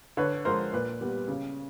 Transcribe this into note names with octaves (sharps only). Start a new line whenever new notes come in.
D3 B4 C#5
F3 G#3 A#4 C5
A#2 B4
G3 B3
C#3